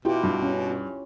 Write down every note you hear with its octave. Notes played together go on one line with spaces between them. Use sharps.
B2 E4 F4 G4 G5
G2
C#4